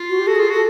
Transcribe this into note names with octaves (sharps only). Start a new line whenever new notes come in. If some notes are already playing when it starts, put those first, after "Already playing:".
Already playing: F4
F#4
G4
F#4 A4
G#4
F4
F#4 A4